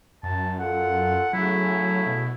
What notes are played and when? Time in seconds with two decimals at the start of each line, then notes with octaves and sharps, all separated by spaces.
0.23 F#2 A5
0.59 F4 A4 F#5
1.33 C#3 F#3 A3 E4
2.06 B2